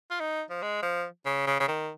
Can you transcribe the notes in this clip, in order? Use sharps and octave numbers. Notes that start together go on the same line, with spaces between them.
F4
D#4
F3
G#3
F3
C#3
C#3
C#3
D#3